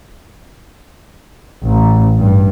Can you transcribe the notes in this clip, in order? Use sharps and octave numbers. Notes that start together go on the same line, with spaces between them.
A1
G2